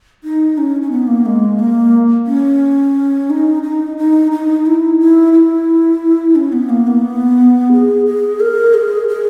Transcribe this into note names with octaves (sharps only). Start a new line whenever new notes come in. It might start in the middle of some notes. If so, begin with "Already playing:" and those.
D#4
C#4
C#4
B3
A#3
G#3
A#3
C#4
D#4
D#4
D#4
D#4
E4
E4
E4
C#4
B3
A#3
B3
G#4
G#4
A#4
G#4
G#4